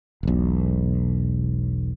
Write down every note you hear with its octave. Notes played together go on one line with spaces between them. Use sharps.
E1 B1